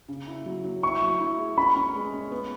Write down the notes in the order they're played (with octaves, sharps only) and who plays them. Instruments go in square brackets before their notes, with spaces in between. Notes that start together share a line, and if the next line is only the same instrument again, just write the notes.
[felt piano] C#3
E4
F#3
F#3
[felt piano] E4 [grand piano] C#6
[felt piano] F#3
E4
G#4
[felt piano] C#4 [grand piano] B5
[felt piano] C#4
G#3
C#4
B3